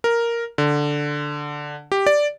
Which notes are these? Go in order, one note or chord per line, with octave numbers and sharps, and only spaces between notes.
A#4
D3
G4
D5